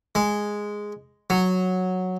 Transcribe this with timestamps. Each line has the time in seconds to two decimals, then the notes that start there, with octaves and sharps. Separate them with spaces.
0.15 G#3
1.30 F#3